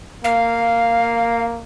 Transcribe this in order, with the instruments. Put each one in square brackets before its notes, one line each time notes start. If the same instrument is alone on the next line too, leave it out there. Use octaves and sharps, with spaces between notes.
[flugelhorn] A#3 [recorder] F5